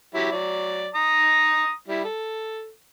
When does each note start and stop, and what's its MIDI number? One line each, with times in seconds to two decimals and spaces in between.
0.14 0.30 54
0.14 0.30 64
0.14 0.30 67
0.32 0.90 54
0.32 0.90 74
0.95 1.72 82
0.95 1.72 87
1.88 2.04 55
1.88 2.04 64
2.04 2.70 69